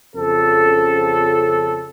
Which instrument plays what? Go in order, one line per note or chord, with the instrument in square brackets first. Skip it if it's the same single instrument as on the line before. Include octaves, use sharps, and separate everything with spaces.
[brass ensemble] F2 C#3 A4